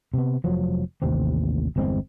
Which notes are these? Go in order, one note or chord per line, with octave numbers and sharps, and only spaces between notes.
C3 B3
F1 F3 F#3
A1 D#2 C3 C4
G1 E2 G#3 C4